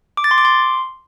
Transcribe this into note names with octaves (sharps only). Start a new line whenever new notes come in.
D6
A6
C6
D6
C6